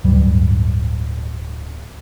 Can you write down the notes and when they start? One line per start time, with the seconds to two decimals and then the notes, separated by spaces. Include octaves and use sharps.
0.04 D1 G2 G3